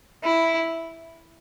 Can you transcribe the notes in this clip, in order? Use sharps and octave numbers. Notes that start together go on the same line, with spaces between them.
E4